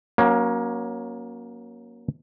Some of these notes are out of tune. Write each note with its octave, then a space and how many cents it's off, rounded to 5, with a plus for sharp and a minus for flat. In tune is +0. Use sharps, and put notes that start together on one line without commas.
F#3 +0 A#3 +25 C#4 +0